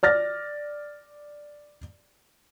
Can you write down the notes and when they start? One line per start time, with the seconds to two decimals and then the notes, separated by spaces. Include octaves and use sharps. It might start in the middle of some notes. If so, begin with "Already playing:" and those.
0.03 D5 F6 A6 A#6